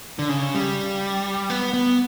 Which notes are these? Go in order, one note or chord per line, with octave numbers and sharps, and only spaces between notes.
D3
C#3
G3
B3
B3